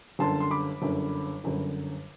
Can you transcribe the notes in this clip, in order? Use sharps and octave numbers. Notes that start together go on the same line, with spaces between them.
G1 F#2 D3 A5 C6
C6
B5 D6
G1 F#2 D3
G1 F#2 D3